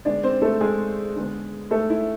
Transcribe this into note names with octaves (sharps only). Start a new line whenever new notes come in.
D3 G#3 B3 D4 D5
C4 C5
A3 A4
G#3 G#4
D3 G#3 B3
A3 A4
E4